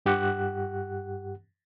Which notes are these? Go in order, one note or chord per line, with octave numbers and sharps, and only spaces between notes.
G2 G4 F#5 F#6